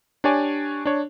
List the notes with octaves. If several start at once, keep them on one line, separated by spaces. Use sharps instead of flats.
D4 G4 C#5 D5 G#5
D4 C#5